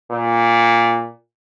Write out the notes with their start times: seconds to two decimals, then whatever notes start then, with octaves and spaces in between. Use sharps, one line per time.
0.11 A#2